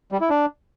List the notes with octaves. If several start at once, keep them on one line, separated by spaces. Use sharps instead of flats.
G3
E4
D4